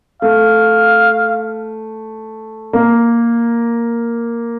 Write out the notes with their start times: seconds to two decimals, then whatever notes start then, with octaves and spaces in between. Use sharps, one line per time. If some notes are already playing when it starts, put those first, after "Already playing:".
0.22 A3 F5
2.73 A#3